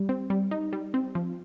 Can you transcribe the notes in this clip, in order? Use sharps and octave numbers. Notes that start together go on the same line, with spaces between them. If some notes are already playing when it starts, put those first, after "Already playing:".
Already playing: G3
C4
G3
D#4
G3
C4
F3